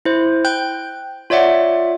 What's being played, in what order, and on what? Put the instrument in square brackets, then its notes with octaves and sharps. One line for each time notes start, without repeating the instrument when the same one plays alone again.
[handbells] E4 C5
G5 F#6 G6
F4 C#5 D5 E5 F#5